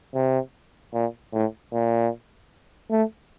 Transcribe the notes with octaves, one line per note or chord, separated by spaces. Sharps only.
C3
A#2
A2
A#2
A3